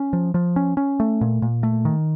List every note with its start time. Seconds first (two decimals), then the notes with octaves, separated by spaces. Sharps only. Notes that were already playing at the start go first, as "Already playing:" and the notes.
Already playing: C#4
0.13 F3
0.34 F3
0.56 C#4
0.77 C#4
1.00 A3
1.21 A#2
1.42 A#2
1.63 A3
1.85 D#3